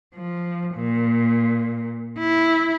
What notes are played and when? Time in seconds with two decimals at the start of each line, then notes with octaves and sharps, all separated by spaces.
0.15 F3
0.75 A#2
2.19 E4